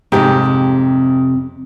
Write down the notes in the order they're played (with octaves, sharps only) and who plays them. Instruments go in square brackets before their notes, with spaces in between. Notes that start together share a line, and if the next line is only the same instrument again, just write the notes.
[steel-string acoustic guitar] F2 C3 [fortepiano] G#2 G4